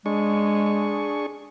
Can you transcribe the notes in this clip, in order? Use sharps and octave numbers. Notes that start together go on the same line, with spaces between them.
G#3 D4 G#4 C#6